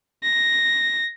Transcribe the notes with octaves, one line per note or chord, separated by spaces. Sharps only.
A#6